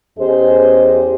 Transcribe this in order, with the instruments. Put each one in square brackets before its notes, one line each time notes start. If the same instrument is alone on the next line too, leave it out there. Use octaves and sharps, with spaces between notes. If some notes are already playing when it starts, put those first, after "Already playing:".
[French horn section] E2 C#4 G4 G#4 C5 D#5